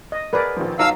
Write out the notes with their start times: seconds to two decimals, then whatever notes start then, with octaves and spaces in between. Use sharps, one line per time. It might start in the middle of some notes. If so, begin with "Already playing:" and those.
0.12 D#5
0.33 B3 G#4 A#4 B4 D5
0.56 A#1 D#3 F3
0.79 F#3 D#4 D#5 F5 A5 E6